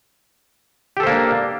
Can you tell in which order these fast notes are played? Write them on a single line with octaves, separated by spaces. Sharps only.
G4 A4 C5 A#3 D4